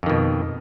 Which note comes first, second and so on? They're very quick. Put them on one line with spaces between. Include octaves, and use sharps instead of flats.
F2 D#3 B2